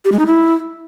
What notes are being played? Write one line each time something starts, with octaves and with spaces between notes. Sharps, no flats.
G4
G#3
D#4
E4